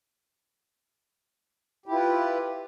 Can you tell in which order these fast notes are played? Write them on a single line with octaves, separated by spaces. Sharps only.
G4 E4 F4 B4